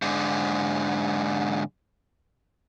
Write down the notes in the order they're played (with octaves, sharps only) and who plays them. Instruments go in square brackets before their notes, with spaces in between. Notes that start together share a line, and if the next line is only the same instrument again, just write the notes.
[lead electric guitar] G#2 D3